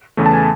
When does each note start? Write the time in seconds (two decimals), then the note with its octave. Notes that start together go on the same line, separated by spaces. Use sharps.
0.17 E2 C#3 E3 A3
0.26 A5
0.33 G#5